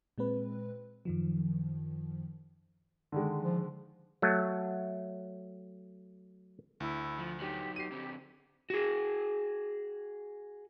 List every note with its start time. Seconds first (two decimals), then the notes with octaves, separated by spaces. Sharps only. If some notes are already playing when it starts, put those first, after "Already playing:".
0.18 A#2 G#3 C4 B4
1.05 F#2 D#3 F3
3.12 D3 D#3 G#3
3.42 F3
4.22 F#3 A3
6.80 D2 E4
7.19 F3
7.40 F#3 D#4 G4
7.76 G4 C7 D#7
7.92 D3 C4
8.70 F#4 G#4